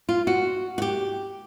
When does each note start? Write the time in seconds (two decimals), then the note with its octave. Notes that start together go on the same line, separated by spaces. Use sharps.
0.09 F4
0.27 F#4
0.78 F#4
0.82 G4